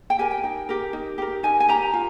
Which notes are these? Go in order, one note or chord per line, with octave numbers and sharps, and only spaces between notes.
G5
G4 A#4 G#5
G5
D#4
G4 A#4
D#4
G4 A#4
D#4 G#5
G#5
G4 A#4 A#5
F4